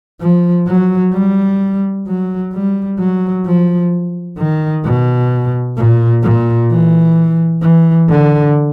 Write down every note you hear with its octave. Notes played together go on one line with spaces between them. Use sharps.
F3
F#3
G3
F#3
G3
F#3
F3
D#3
B2
A#2
A#2
E3
E3
D3